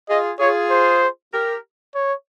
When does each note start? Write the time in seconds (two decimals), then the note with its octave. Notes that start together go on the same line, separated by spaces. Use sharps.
0.09 F4 G#4 D#5
0.40 F4 G#4 C#5
0.71 C5
1.33 G4 A#4
1.95 C#5